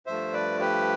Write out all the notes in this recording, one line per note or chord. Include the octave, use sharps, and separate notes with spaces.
G2 F3 A3 C5 E5
B4 D5
G4 B4